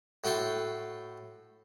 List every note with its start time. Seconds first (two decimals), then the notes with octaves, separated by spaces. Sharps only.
0.24 A2 F#4 A4 G5 A5 C6